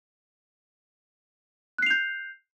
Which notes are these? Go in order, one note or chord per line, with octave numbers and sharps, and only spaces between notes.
F#6 G6 C7 F7